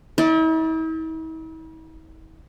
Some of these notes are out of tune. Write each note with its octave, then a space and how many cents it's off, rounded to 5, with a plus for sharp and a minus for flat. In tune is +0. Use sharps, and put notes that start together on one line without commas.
E4 -45 D5 +5